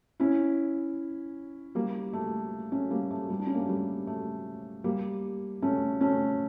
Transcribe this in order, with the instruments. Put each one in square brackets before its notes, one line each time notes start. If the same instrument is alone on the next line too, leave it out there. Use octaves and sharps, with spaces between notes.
[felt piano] C#4 E4
G3 A#3
A3
A3 C#4
G3 A#3
A3
G3
D4
C#4
A#3
A3
G3
A3
G3 A#3
A3 C#4
A3 C#4